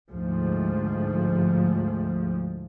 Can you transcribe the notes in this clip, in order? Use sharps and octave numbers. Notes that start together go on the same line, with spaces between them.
D2 G#2 F3